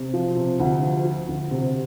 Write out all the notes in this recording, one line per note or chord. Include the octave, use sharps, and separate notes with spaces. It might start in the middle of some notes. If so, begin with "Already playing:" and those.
Already playing: C3
F3
C3
D2
F3
F3
D2
C3